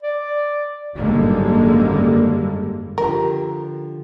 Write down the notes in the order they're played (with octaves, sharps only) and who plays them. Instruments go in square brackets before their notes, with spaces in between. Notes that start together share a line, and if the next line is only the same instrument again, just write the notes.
[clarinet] D5
[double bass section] G#1 F#2 D3 G3 G#3 A#3
[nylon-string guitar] D3 F3 G4 [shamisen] A#4